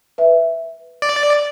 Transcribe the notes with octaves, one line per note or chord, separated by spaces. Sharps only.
B4 E5
D5